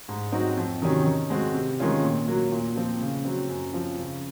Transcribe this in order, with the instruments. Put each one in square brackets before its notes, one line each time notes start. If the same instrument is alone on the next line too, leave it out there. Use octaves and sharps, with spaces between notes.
[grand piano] G#2
F#3 C4 D#4 F#4
F2
C3 D#3 F#3 C#4
D#3
G#3 C4 F#4
C3
D#3 G#3 C#4 F4
A#2
F#3 A#3
A#2
F3 C4
C#3
F#3 C4
F#2
F3 C4
C#3